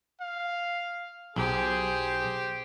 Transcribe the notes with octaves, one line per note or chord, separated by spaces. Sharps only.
F5
B1 G4 G#4 C5